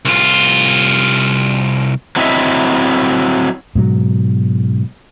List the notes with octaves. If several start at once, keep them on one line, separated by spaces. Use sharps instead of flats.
C2 F4
F#3 C4 E4 D#5 E5
G#2 B2 F#3